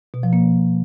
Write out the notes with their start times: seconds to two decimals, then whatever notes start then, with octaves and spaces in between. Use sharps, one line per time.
0.14 B2
0.23 F3
0.33 A#3